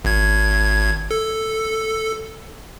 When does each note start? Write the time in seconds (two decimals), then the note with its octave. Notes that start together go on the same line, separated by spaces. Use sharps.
0.05 G#1 G#6
1.11 A4